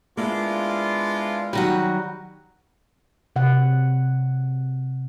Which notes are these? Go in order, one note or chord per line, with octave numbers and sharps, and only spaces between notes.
G#3 A#3 B3 D4 E4 F4 D6
D#3 E3 F#3 G3 D#4 F#4
C3 F#5